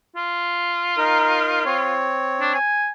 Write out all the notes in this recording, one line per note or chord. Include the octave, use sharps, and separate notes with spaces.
F4
D#4 A#4
C4 C#5
D4
G#5